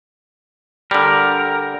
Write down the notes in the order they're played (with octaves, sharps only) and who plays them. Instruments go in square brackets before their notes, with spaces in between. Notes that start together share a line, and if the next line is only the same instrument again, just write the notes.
[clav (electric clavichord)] D3 G3 [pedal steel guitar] A#4